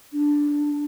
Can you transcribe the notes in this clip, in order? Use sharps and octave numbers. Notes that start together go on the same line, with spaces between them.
D4